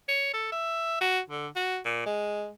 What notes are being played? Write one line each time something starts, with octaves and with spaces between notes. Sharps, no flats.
C#5
A4
E5
F#4
D3
F#4
A#2
G#3